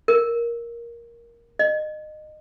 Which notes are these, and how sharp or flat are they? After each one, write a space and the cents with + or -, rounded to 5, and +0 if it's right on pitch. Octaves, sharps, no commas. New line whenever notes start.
A#4 +10
D#5 -25